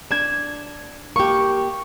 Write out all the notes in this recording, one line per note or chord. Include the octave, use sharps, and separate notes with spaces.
D4 G#6 E7
A#3 G4 C#6